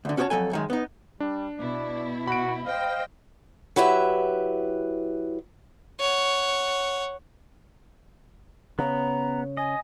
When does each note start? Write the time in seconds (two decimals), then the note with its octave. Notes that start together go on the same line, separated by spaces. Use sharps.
0.05 D2 D3
0.17 C#4 F#4 G4 C5 C#5 A5
0.30 F2 C3 F#3 A4 G#5
0.51 F#2 D#3 G#3
0.70 B3 D#4
1.20 G3 D4
1.58 B2 E4 D5
2.28 F#4 B5 D7
2.66 C5 D#5 F5 G5
3.76 F#3 E4 G4 B4 E5
6.00 C#5 F#5
8.79 C#3 B3 A#5
9.57 D#5 G#5